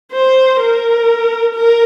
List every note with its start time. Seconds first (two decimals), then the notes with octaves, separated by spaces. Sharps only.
0.12 C5
0.60 A#4
1.55 A#4